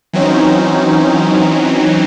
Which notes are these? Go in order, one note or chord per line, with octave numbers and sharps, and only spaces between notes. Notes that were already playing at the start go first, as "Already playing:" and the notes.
E3 F#3 C4 C#4 D#4